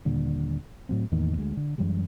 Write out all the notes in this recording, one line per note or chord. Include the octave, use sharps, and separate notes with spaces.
D#2 A#2 D3 G3
A2 F#3 C4
E2 A2 D#3 A#3
D2 G#3
D3
F#2 E3 G3 G#3